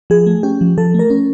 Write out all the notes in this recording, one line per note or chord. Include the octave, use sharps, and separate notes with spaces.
F3 G#4
A3
C#4 G4
F3
F3 A4
A3
A#4
C#4